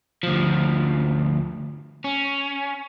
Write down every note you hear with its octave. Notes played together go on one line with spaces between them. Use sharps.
D2 F3
C#4